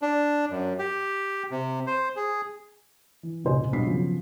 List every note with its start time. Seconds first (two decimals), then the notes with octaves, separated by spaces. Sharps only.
0.02 D4
0.51 F#2
0.79 G4
1.51 C3
1.87 C5
2.16 G#4
3.23 E3
3.44 F1 C#2 A#2 C5 D#5 G#5
3.73 B1 G2 D4 B5 B6 C7
3.87 C#3 F3 F#3 B3